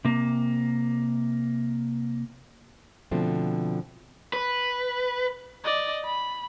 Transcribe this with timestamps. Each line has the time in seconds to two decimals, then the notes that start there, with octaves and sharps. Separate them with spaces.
0.05 C3 A#3
3.11 B2 D3 F3 A3 C4
4.33 B4
5.64 D5 D#5
6.05 B5